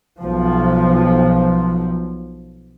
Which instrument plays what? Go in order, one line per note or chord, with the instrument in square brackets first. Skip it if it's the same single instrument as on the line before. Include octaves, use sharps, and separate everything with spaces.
[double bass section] B1 F3